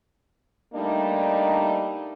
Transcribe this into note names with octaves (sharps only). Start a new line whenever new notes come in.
G3 A3 A#3 D4 D#4